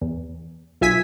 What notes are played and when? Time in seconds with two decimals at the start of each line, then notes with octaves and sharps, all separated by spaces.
0.01 E2
0.81 B1 F4 E5 G#5 G#6 B6